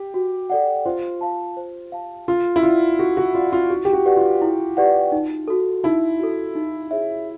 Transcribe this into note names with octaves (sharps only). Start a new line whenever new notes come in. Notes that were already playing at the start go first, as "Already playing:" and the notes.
Already playing: G4
F#4
A4 D5 F#5
F4 C5
F5 A5
C5
F5 A5
F4 A4
E4
F4 D5 F#5
F#4 A4
F#4
F4 D5 F#5
F4
E4 F#4
G4
F#4
G4 B4 D5 F#5
F4
E4
G4 B4 D5 F#5
D#4
F#4 A4
D#4 E4
F#4 A4
D#4
G#4 C#5 E5